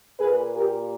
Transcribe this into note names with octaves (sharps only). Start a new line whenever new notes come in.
A#2 A#3 G#4 B4
G4 A#4